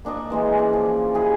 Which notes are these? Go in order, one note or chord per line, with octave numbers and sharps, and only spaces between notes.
A#3 D4 D#5 C#6
E3 G#3 A#3
C#4 D5
F3
E4 G4 G#4